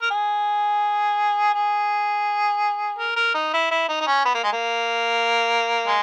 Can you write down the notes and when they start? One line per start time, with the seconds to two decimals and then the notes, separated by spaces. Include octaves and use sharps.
0.02 A#4
0.10 G#4
1.54 G#4
2.99 A#4
3.16 A#4
3.35 D#4
3.54 E4
3.71 E4
3.89 D#4
4.01 D#4
4.07 C#4
4.25 B3
4.34 A#3
4.44 G#3
4.53 A#3
5.87 G#3